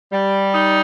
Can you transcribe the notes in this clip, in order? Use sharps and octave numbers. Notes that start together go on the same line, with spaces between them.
G3
D#4